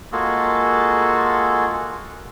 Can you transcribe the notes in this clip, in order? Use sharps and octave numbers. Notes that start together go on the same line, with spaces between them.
G#3 A#3 F4 F#4 G#4 A4